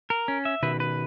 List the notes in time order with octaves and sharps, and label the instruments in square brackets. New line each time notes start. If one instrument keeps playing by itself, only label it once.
[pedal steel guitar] A#4
C#4
E5
[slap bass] B2 D#3 [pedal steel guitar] B4
[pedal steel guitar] B4